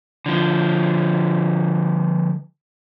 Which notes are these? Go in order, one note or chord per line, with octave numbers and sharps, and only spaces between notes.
D3 F3